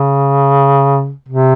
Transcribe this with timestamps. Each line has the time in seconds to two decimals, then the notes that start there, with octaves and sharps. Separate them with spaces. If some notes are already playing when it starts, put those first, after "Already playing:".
Already playing: C#3
1.29 C3